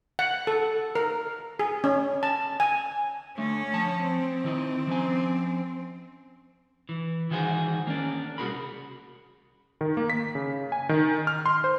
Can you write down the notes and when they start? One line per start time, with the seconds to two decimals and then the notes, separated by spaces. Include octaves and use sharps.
0.19 F#5
0.47 A4
0.95 A#4
1.59 G#4
1.84 C#4
2.23 A5
2.60 G#5
3.38 D3 A3 C#4
3.73 F3 A5
4.04 C4
4.44 D#3 E4 D#5
4.87 F3 C#4 G#5
6.89 E3
7.31 D#3 E3 F#4 G#4 C5
7.87 A#3 C#4 D4
8.38 C2 F#4 G#4 A#4 B5
9.81 D#3
9.97 A#3
10.10 B6
10.35 C#3
10.72 G#5
10.89 D#3
11.27 F6
11.46 C6
11.64 C5